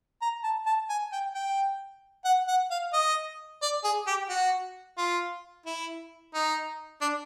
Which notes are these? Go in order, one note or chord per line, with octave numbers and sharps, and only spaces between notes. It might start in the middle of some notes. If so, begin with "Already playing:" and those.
A#5
A5
A5
G#5
G5
G5
F#5
F#5
F5
D#5
D5
G#4
G4
F#4
F4
E4
D#4
D4